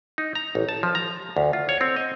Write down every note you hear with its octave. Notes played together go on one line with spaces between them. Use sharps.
D#4
A#5
A1
A5
F3
A#5
D2
F4
C#5
C4
D#5